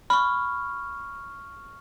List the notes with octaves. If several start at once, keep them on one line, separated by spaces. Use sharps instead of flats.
B5 C#6 F6